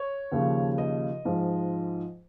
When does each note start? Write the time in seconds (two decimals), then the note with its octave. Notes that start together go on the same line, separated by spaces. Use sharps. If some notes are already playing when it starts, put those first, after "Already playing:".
Already playing: C#5
0.32 D#2 C#3 F3
0.78 D#5
1.25 G#2 F3